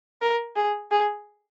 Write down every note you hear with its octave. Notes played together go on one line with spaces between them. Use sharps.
A#4
G#4
G#4